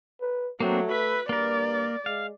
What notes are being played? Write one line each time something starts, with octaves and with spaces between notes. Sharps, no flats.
B4
F#3 A3 A#3 C4 D4
B4 E5
G2 A#3 A#4 D5
G#3 F5